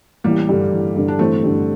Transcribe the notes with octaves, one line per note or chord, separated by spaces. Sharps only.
A1 G3 A#3
G2 D3
A1
G2 D3
D4
A1 A3 C4
G2 D3